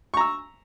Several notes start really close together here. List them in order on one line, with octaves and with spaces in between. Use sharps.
C#6 A#5 E6